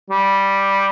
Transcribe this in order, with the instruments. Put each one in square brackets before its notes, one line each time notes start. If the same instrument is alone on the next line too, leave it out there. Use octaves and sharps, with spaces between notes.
[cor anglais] G3